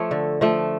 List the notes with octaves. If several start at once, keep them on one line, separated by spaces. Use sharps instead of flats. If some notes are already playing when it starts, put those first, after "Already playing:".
Already playing: F3 A3 C#5
D3
F3 A3